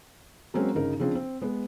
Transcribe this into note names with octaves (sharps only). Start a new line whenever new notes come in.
F#3 G#3 A#3 C4 C#4
G1 C#3 D#4 A#4
C#3 F3 C4 D4 G#4
C4
G#3 B3